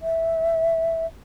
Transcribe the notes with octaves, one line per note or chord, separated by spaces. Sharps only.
E5